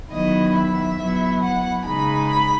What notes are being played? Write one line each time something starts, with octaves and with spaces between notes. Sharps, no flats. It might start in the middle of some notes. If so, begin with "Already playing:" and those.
D#3 F#3 B3 E4 D#5
E5
F#3 B3 E4
F#5
C#3 G#3 D#4 B5
B5